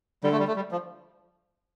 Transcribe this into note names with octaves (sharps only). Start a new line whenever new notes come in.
D3 G3
A3
G3
A3
G3
F3